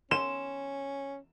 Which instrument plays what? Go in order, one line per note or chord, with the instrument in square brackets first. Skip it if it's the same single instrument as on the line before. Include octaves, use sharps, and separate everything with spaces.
[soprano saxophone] C#4 [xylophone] C6 [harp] E7